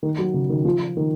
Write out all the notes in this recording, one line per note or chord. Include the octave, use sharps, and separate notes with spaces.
D#3
F#3
C#3
D#3
F3
D#3